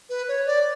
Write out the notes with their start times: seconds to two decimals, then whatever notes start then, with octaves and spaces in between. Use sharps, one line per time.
0.09 B4
0.28 C#5
0.46 D5